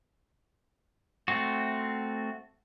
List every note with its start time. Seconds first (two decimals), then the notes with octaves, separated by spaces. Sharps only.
1.28 A3 C4 F#4